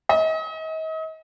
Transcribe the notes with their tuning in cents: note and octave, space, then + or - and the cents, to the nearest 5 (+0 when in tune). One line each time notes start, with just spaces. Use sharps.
D#5 +40